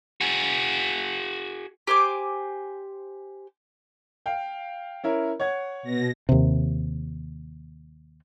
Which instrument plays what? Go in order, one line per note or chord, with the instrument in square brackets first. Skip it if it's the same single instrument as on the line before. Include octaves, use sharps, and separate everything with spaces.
[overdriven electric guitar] F#4 G#4
[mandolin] G4 C5 G#5 D6
[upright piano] F5 G5
C#4 E4 A#4
C#5 F#5 G#6
[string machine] B2 A#6
[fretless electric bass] D#2 C3